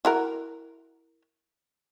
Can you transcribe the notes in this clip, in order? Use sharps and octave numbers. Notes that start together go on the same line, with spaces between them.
E4 F#4 A#4